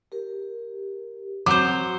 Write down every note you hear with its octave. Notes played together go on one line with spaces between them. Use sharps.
G4 A#4
F#3 C4 F#4 C5 D6